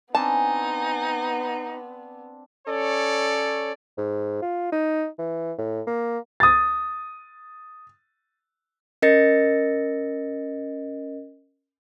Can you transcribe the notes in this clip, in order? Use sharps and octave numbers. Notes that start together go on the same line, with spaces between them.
B3 C4 D4 D#4 G#5 A5
C#4 A4 C#5 D5
G#2
F4
D#4
E3
A2
A#3
D#6 A6
C#4 A#4 D#5 A6 A#6 C#7